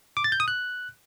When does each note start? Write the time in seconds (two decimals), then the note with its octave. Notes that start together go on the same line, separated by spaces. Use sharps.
0.17 D6
0.24 A6
0.32 G6
0.40 D#6
0.48 F#6